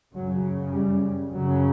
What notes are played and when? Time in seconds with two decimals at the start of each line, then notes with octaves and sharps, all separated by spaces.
0.15 F#2 C#3 F#3
0.73 G3
1.32 F#2 C#3 F#3